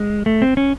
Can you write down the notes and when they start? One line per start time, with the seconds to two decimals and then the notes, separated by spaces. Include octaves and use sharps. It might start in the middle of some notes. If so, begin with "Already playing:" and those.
Already playing: G#3
0.26 A3
0.42 C4
0.57 C#4